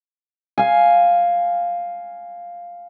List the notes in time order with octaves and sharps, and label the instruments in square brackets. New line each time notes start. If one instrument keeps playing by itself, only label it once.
[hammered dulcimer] F5 G#5